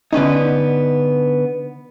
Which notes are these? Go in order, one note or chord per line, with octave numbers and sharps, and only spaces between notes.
D3 B3 C#4 D#4